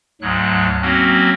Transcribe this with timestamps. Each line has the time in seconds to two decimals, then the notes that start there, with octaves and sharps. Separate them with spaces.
0.22 D2 G#2 F#3 F#6
0.82 F#3 A#3 C4 C#4 F#4